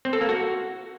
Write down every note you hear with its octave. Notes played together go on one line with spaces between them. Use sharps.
C4
A4
A#3
F#4